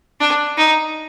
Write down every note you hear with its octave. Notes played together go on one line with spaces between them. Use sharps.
D4
D#4